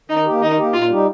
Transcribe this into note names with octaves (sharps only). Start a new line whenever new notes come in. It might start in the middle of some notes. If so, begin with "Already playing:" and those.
D#3 D#4
A#3 G4
D#3 D#4
A#3 G4
A#2 F4
G3 D#4 G4